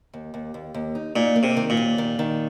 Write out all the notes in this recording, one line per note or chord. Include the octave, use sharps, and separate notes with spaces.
D#2
D#2
D#2
D#2
D#4
A#2 D#4
A#3
C3
D#3
A#2
D#2
D#3
D#3